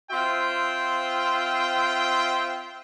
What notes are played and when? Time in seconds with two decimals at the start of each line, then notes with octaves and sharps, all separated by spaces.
0.10 C4 F4 C5 E5 G5